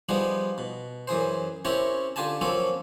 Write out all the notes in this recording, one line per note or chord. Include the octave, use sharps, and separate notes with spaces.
F3 G3 B3 D#4 G#4
B2
F#2 E3 G#4 C5
C4 C#4 E4 G4 A#4 C#5
D3 F4 G4 G#5 A5
F3 F#3 A#3 C4 C#4 A4